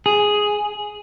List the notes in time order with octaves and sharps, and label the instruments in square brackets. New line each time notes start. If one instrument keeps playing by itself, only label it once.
[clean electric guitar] G#4